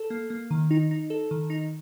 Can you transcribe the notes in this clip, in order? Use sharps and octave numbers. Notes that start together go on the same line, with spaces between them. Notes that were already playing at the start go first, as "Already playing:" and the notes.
Already playing: A4
A#3
A#3
D#3
D#4
D#4
A4
D#3
D#4